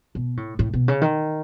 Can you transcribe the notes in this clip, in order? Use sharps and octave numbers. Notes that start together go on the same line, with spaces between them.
B2
A2
A2
B2
C#3
D#3